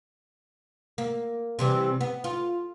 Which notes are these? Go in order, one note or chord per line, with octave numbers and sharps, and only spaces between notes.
A#3
C3 E3 G3
B3
F4